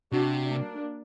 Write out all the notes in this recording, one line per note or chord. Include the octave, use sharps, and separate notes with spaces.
C3 D4 F#4
A#3 D4